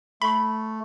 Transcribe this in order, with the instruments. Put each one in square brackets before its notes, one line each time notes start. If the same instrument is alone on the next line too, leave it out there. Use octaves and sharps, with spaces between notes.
[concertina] A3 [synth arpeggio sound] B5